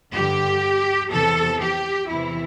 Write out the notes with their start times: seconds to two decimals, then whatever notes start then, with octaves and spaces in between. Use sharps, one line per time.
0.13 G2 D3 G4
1.11 E2 C3 E3 A4
1.61 G4
2.09 E2 C3 E3 E4